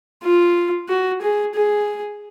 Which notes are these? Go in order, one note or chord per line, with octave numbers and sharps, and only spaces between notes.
F4
F#4
G#4
G#4